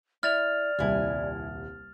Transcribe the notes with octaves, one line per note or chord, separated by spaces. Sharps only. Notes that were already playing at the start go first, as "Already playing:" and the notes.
E4 D5 F6 A6 F7
D#1 C2 E4 G#5